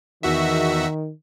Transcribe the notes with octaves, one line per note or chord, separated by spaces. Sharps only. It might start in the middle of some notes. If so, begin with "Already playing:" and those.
E2 D#3 F#4 E5